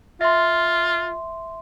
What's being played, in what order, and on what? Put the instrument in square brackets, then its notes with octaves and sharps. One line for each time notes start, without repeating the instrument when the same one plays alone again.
[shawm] F4 [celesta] E5 C6